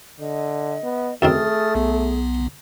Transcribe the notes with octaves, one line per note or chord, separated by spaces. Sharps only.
D3 D#5
B3
F#2 D#3 A3 C4 G#4 D#6 F6 A6
B1 B3